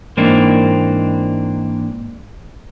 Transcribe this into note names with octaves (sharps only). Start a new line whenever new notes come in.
G#2 E3 A#3 C4 D4 D#4